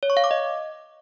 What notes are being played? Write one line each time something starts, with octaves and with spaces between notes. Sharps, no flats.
C#5
C#6
F5
D6
D#5